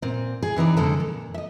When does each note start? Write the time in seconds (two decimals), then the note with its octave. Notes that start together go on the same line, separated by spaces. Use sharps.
0.02 A#2 C4
0.43 G#4
0.56 C3 E3 D#4 D5
0.77 F2 D3 G#3 A4
1.00 A#2
1.34 D#5 E5